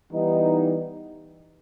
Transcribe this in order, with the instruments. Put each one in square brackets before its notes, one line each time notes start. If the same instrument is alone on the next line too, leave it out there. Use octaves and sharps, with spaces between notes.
[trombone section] E3 G3 B3 D#4